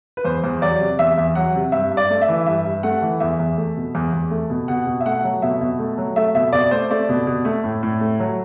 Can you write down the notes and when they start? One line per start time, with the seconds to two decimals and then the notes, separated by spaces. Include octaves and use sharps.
0.17 B4
0.25 E2 C5
0.44 E2
0.62 F#3 D5
0.80 C3
0.99 E2 E5
1.18 E2
1.35 F#3 F#5
1.55 C3
1.72 G2 E5
1.91 G2
1.97 D5
2.10 A3
2.22 E5
2.29 E3
2.47 G2 E5
2.64 G2
2.83 A3 F#5
3.02 E3
3.20 E2 E5
3.40 E2
3.57 A3
3.77 B2
3.95 E2
4.13 E2
4.31 A3
4.50 B2
4.68 B2 F#5
4.87 B2
5.01 E5
5.06 A3 F#5
5.24 F#3
5.42 B2 E5
5.61 B2
5.79 A3
5.98 F#3
6.16 A3 E5
6.35 B2 E5
6.53 B2 D5
6.71 A3 C5
6.90 A3 D5
7.09 B2
7.27 B2
7.45 A3
7.64 A2
7.83 A2
8.01 A3
8.20 F#3